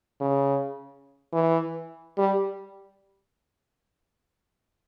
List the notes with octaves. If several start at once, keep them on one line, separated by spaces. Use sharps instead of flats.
C#3
E3
G3